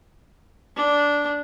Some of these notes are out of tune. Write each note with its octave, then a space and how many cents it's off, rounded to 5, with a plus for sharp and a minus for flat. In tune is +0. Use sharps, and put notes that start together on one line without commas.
D4 -10